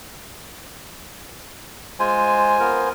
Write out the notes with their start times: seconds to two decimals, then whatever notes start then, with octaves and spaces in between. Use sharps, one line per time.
2.00 G#3 F4 C5 G#5
2.60 B3 F4 A#4